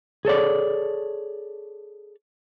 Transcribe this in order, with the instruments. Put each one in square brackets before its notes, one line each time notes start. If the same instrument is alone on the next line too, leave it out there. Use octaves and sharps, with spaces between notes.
[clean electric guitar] G#4 A4 C#5 D5